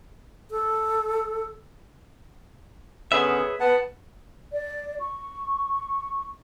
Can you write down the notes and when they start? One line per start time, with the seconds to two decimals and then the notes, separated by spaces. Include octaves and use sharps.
0.51 A4
3.12 D3 B3 C#4 G#4 B4 C#5 E5
3.60 B3 F#5 A5
4.53 D5
5.00 C#6